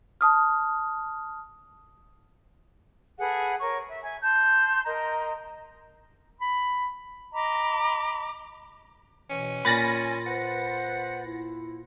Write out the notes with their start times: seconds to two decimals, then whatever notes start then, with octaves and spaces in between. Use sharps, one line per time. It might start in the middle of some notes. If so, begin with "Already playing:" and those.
0.21 A5 D#6 F6
3.19 G#4 A4 B4 F#5
3.59 A#4 C#5 C#6
3.88 E5
4.03 E5 G#5
4.22 A5 C6 G6
4.85 A#4 D#5 A#5 C6
6.41 B5
7.33 D#5 A#5 B5 D6
9.30 B2 E3 C#4
9.65 A#2 G#5 B5 A6 A#6
10.26 B4 C5 F#5
11.25 E4